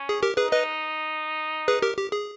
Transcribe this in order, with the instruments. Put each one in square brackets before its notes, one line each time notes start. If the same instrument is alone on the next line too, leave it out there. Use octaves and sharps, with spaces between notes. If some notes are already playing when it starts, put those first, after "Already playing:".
Already playing: [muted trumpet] C#4
[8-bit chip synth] G#4
G4 A#4
[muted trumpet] D#4 [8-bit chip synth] G#4 B4
[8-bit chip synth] B4 D#5
G#4 B4
G4 A#4
G4
G#4